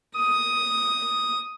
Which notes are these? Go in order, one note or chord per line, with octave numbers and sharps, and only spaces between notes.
D#6